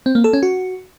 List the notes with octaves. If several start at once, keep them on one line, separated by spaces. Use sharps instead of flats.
C4
A#3
A4
C#4
F#4